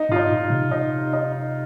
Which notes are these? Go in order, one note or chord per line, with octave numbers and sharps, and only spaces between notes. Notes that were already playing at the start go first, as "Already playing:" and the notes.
Already playing: D#4
G#2 F4
D#4
A#2
C3
D#4
D#4